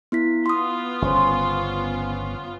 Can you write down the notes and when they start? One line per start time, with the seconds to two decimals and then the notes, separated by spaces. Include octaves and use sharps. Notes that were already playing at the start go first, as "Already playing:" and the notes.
0.12 B3 E4 B6
0.46 B3 F4 C6 D#6
1.02 G1 C#3 C#4 C5